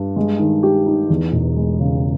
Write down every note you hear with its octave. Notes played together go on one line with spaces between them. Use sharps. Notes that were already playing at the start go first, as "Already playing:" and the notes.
Already playing: G2
G#3
D#3
G4
D#4
E2
E1
G#3
C#3